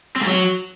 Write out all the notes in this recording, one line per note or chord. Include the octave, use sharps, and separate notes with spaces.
C4
G#2
F#3